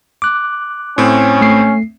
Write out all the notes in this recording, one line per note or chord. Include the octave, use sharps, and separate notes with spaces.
D6 F#6
A2 C4 C#4
A3 C7